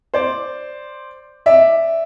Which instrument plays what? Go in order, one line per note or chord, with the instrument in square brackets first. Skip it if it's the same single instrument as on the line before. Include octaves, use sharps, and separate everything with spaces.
[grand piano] C5 D5
D5 E5